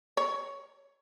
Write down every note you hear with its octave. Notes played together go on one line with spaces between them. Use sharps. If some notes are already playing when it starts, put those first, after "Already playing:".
C#5